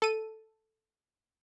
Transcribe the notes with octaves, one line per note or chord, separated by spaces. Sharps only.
A4 D#7